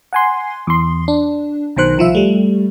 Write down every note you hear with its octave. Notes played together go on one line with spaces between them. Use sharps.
F#5 G#5 C6
E2 C6
D4
B1 B2 D#3 C5 F#6
C2 F3 F4 E5
G3 A3